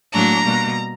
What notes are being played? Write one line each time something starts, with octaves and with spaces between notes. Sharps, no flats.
A2 F#3 A#3 D4 A#5
B2 G3 A#3